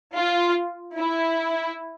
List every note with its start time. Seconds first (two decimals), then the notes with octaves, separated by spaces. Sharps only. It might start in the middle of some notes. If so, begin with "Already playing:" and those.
0.15 F4
0.97 E4